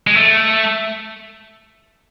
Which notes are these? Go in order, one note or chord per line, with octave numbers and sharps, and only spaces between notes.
G#3
A3